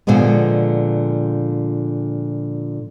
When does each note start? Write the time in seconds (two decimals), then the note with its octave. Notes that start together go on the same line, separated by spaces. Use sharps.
0.07 A#2 D3 F3 G#3 B3